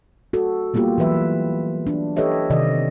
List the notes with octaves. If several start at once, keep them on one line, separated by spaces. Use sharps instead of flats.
F#4 A4
G3 A#3 B3 F4 G4
E3 F#3 B4 E5
D4
G4 A4 B4 C#5 D#5 E5
C3 D#3 D5 D#5